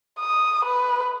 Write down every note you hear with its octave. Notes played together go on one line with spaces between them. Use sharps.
D#6
B4